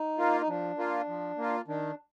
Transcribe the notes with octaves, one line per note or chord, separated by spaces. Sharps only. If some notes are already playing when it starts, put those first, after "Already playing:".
Already playing: D#4
A#3 F4
D#4
F3 D4
A#3 F4
F3
A#3 F4
D#3 D4